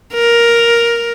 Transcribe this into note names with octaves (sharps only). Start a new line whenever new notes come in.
A#4